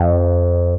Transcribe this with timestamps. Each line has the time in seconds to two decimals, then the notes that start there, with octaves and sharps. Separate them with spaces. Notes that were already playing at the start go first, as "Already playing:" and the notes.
Already playing: F2